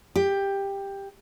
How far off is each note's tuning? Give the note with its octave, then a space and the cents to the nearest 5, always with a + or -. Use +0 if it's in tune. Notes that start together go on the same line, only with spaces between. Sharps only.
G4 +10